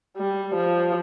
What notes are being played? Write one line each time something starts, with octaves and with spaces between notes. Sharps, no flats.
G3
F3